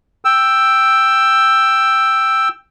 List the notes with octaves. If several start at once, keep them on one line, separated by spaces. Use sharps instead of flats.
G5 E6